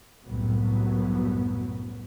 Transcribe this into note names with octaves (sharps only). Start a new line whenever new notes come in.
C2 F#2 A2 F#3 B3